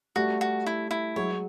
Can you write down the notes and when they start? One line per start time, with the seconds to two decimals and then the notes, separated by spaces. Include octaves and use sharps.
0.16 G3 A3 F#4
0.41 F#4
0.66 E4
0.91 E4
1.16 F#3 G#3 C#5